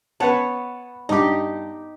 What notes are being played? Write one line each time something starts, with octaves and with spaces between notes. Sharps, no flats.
B3 B4 C#5 F#5 A5
G2 D#4 G4 D6